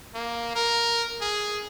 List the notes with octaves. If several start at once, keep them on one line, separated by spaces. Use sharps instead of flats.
A#3
A#4
G#4